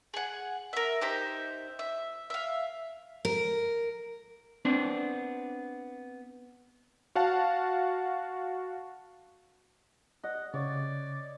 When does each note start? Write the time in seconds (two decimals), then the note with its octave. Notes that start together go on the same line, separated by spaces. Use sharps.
0.14 G#4 F#5
0.73 A#4 E5
1.01 D#4 G4 C5 E5
1.79 E5
2.30 E5 F5
3.25 A#4
4.65 B3 C4 D4
7.15 F#4 F5 F#5 A5
10.23 D#5 F#5
10.54 C#3 C#5 D5